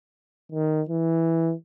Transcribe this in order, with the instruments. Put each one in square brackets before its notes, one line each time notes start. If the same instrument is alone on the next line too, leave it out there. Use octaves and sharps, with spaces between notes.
[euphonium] D#3
E3